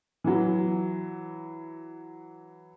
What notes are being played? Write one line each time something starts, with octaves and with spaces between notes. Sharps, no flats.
E3 F#3